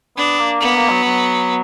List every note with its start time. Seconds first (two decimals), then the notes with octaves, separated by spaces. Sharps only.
0.17 B3 D4
0.39 A#3
0.61 A#3 B3
0.75 A#3
0.90 F#3
1.04 F#3